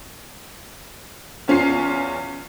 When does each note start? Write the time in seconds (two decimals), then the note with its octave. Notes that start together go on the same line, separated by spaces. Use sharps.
1.48 E2 C#4 F4 C7